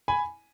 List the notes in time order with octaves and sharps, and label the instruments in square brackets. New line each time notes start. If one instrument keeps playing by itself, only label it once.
[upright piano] G#5 B5